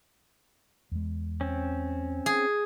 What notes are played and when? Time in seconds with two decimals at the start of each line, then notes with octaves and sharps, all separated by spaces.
0.92 E2 G#3
1.41 C4 C#4
2.26 G#4